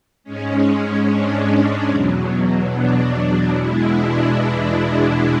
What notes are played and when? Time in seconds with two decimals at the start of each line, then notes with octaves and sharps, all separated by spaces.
0.24 G#2 G#3 C#4
0.65 C#4
1.06 D4
1.47 C#4
1.88 E2 B2 F#3
2.69 D4
3.51 E2 B2 G#3 E4
3.92 D4